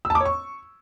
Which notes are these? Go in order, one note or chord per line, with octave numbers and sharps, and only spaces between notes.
E6
A5
D6
C#5
C#6